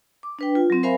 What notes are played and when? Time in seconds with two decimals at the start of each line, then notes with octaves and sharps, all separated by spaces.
0.23 D6
0.39 D4 B4 G5
0.55 F4
0.70 F#3 C4
0.83 A#4 C5 E5 F5 G#5 B5